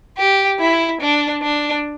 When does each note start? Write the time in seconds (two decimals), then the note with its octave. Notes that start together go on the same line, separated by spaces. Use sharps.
0.18 G4
0.60 E4
1.01 D4
1.43 D4